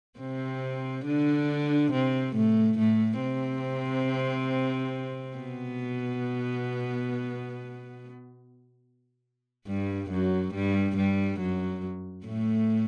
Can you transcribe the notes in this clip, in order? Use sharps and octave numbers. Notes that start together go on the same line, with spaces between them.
C3 C4
D3 D4
C3 C4
A2 A3
A2 A3
C3 C4
B2 B3
G2 G3
F#2 F#3
G2 G3
G2 G3
F#2 F#3
A2 A3